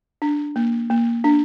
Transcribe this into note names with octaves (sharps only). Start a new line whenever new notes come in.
D4
A#3
A#3
D4